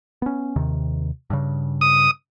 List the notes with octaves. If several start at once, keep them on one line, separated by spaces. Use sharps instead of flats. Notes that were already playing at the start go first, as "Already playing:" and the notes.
B3 C#4
D#2 C3 D#3
G2 C#3
D#6